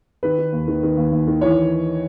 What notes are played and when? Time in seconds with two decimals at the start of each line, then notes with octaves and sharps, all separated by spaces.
0.23 D#3 B4
0.38 D#3
0.52 D#2
0.68 D#3
0.83 D#3
0.97 D#2
1.12 D#2
1.27 D#3
1.41 E3 C#5